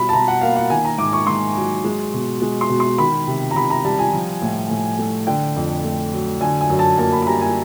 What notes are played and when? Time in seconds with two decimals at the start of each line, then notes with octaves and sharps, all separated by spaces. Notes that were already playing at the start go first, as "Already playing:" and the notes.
Already playing: B2 G3 B5
0.09 A5
0.13 B2 A#5
0.28 F#5
0.41 A#3 F5
0.56 F#5
0.70 D#3 G#5
0.85 A#5
0.98 G#2 D6
1.13 C#6
1.27 G#2 C6
1.56 F#3
1.84 G#3
2.14 B2
2.42 G#3
2.61 C6
2.69 B2
2.80 C6
2.98 D#3 B5
3.27 C3
3.51 A#5
3.56 C3 B5
3.70 A#5
3.85 G3 A5
3.99 G#5
4.13 F3
4.42 A2
4.70 A2
4.98 A3
5.27 D3 G5
5.56 F2
5.85 A3
6.13 F#3
6.41 D3 G#5
6.61 G#5
6.70 F#2
6.79 A5
6.98 A#3 A5
7.12 B5
7.22 B5
7.27 G3 A#5
7.41 G#5